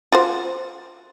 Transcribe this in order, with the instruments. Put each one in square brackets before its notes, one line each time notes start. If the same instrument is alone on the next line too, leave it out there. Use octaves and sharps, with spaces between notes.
[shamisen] F4 F#4 C5